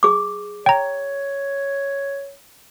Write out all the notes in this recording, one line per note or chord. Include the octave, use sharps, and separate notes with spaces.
G#4 D6
C#5 G5 A#5